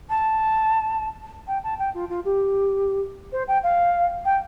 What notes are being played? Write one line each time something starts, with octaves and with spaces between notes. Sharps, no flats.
A5
G5
A5
G5
F4
F4
G4
C5
G5
F5
G5